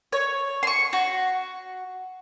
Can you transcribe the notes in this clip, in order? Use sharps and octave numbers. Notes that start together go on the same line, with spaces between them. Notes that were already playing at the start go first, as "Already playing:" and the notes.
C#5
C6 C#6
F#4